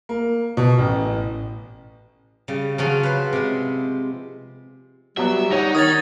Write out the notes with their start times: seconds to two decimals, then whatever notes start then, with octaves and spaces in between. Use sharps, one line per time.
0.09 A#3
0.57 B2
0.78 A1
2.48 C#3 G3
2.78 C#3 F3 F#3 C#4
3.03 B4 C5
3.33 C3 G#3
5.17 F#3 G3 B3 F#4 E5
5.52 D#4 C#5 F#5
5.75 D#3 D#6 G#6 A6